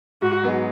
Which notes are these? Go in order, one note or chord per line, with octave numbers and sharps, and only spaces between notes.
G#2 F#4
F#3 B3 D#4 G#4